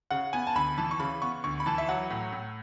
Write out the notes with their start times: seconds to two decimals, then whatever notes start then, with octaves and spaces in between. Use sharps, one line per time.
0.11 C#3 F#5
0.33 B3 G#5
0.47 A5
0.55 D2 B5
0.78 E3 A5
0.91 C#6
1.00 C#3 B5
1.22 B3 C#6
1.44 D2 C#6
1.60 B5
1.66 E3 A5
1.78 E5
1.89 F#3 F#5
2.10 A2
2.32 A2